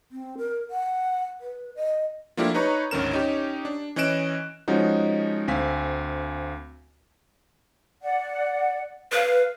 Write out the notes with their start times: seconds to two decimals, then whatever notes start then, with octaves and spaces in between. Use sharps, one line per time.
0.12 C4
0.38 A#4
0.70 F#5
1.41 B4
1.76 D#5
2.37 F3 A3 A#3 D4 E4 G4
2.55 D#4 B4 C#5 A#5 C#6
2.91 G#1 D2 D#3 C#4 A#4 E7
3.11 C#4 D#4 G4
3.65 D4
3.96 E3 C#4 D#5 F#6 D7 E7
4.68 F3 G#3 C#4 D#4 F#4
5.48 D2 C4 F5 G#5 B6
8.02 D5 F#5
9.12 B4 F5